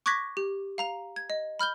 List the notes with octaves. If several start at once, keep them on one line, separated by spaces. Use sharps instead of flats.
C#6 D6 F#6 G#6 A#6 B6
G4
F5 A#5 F7
G#6
D#5
B5 F6 G6 G7